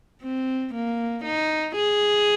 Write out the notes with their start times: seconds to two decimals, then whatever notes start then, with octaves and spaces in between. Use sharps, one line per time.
0.23 C4
0.74 A#3
1.24 D#4
1.76 G#4